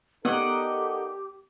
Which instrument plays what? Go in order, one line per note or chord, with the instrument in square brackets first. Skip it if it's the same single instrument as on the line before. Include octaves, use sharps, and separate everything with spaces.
[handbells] B3 [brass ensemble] D#4 A4 A#4 [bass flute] G4 [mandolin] D5 D#5 F#5